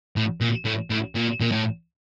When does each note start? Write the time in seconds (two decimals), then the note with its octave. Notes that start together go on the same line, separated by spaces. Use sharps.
0.16 A2
0.41 A#2
0.65 A2
0.90 A2
1.15 A#2
1.40 A#2
1.52 A2